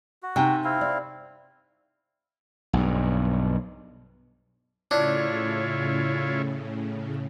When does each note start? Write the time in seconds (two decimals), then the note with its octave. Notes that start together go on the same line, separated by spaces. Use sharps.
0.23 F#4
0.36 C3 D#4 G5 G#5
0.64 C4 E4 F5
0.81 D5
2.73 B1 G2
4.91 A2 C#3 D4 E4 F4 C#5